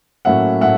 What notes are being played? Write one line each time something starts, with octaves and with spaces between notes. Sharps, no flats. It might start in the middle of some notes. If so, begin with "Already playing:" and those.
A2 F#3 A#3 C#4 E5 F#5
A2 E5 F#5